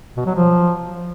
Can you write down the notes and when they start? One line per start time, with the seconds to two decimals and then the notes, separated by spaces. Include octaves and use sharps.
0.17 B2
0.26 F#3
0.35 F3